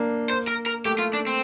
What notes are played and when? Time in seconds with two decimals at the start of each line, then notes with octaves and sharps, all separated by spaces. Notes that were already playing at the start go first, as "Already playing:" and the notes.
Already playing: A#3 D4
0.30 C5
0.48 A#4
0.66 A#4
0.85 A3 G4
0.99 F4
1.13 D4
1.27 C4